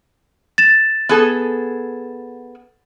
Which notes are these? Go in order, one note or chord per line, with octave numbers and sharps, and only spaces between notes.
A6 E7
B3 G#4 A4